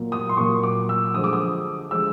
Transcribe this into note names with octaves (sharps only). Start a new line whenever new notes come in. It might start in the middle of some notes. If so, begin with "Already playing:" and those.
Already playing: A#2 F#3 A#3
D#6
C6
A#2 F#3 A#3 C#6
D6
E6
D3 F3 G#3 D#6
D6
D#6
D3 F3 G#3 E6